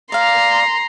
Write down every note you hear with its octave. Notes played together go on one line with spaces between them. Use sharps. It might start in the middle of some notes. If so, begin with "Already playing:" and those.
D5 F5 A#5 C6